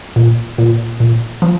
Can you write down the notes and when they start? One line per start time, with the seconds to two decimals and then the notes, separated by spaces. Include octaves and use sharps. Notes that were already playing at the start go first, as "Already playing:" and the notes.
0.16 A#2
0.58 A#2
1.00 A#2
1.42 F3